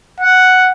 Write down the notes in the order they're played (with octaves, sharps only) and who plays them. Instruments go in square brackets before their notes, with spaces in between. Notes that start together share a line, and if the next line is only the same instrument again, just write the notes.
[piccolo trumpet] F#5